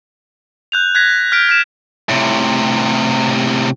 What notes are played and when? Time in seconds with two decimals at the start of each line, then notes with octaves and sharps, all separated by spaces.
0.72 F#6 G6 F7
0.95 F#6 G#6 A#6 B6
1.32 F6 G6 B6 D7
1.49 F6 B6 E7
2.09 A2 C3